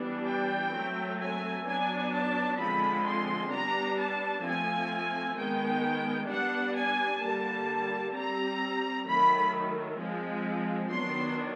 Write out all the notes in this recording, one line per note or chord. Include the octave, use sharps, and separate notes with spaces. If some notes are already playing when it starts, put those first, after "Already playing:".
Already playing: E3 G3 B3 D4
G5
F#3 A3 C4
G#5
F#3 B3 D4 G#5
A5
D3 F3 G#3 C4 B5
C6
G3 B3 D4 A#5
A5
F3 A3 C4 G#5
D#3 G#3 B3 G5
G3 B3 D4 F#5
G#5
D3 G3 A#3 A5
G3 C4 A#5
D#3 F#3 A3 B5
F3 G#3 C4
D#3 F#3 B3 D4 C6